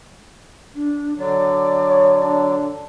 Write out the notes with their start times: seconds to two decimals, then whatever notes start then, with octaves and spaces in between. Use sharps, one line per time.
0.75 D4
1.17 D3 F#3 D5
1.90 C#5
2.23 D4